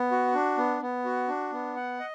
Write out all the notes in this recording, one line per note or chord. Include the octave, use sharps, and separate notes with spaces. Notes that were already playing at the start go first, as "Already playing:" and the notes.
Already playing: B3
F#4
D4
B3
B3
F#4
D4
B3
F#5
D#5